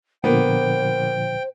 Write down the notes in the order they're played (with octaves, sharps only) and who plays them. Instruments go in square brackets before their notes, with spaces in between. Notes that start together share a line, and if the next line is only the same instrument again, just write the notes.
[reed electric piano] A#2 D3 F3 [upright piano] A#3 B3 [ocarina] C5 [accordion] G5